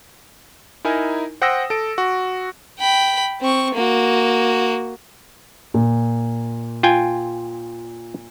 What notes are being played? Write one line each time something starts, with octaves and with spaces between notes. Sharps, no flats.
D#4 E4 A#4 G#5
C5 F#5 G5 D#6 E6 A#6
A4 D7
F#4
G5 B5
C4 C#6
A#3 F#4
A#2
F4 G5 G#5